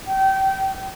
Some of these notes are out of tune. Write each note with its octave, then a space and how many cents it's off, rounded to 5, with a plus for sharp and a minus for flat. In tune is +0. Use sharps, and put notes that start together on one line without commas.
G5 -25